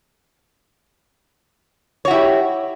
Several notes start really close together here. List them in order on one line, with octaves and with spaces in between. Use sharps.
C#5 F#4 E4 G4